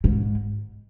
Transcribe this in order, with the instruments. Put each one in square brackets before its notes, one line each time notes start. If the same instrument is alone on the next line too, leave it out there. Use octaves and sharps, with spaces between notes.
[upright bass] G#2